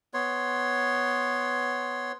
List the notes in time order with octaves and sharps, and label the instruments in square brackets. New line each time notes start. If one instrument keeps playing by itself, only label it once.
[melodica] B3 C#5 C6